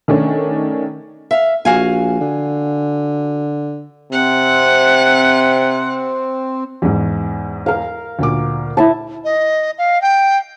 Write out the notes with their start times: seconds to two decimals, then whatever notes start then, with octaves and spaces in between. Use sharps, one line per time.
0.08 D#3 A3 C#4 D4
1.31 E5 F5
1.65 A#1 F#4 F5 G#5
2.21 D3
4.12 C3 C4 F#5
6.82 E2 G#2
7.66 A#4 F5
8.19 D2 A#2 D6
8.77 E4 E5 A5
9.24 D#5
9.78 F5
10.02 G5